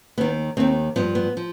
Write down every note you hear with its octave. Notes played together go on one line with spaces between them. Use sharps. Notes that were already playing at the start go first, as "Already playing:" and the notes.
D#2 D#3 B3
D#2 D#3 C4
G2 F3 B3
B3
F3